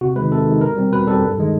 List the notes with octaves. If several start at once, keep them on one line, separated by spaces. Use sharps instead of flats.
C3 F#4
D#3 G#3 B4
C3 A4
D#3 G#3
B2 A#4
G3 C4
B2 B4
G3 C4 A4
G2
D#3 G#3